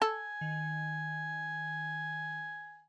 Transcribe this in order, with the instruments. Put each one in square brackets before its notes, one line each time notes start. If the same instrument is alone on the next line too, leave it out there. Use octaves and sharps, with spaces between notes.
[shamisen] A4 [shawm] G#5
[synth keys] D#3